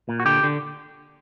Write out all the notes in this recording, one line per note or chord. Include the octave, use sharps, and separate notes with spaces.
A#2
F#4
D3 G4
D3